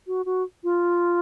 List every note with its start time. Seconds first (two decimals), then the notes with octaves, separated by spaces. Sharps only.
0.07 F#4
0.25 F#4
0.64 F4